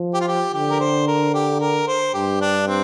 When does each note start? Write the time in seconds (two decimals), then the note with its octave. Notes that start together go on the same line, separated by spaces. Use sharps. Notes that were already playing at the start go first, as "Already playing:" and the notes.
Already playing: F3
0.14 G4
0.21 F4
0.28 G4
0.54 D3 G4
0.71 A#4
0.80 C5
1.07 A#4
1.34 G4
1.61 A#4
1.87 C5
2.14 G2 G4
2.41 D4
2.68 C4